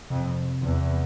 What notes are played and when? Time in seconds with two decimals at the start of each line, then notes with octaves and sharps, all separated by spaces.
0.10 F2 C3
0.62 E2